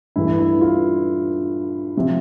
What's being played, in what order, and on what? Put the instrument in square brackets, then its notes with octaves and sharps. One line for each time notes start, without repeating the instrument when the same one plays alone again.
[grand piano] G2 E3 A3 E4
E4
F4
C3 F3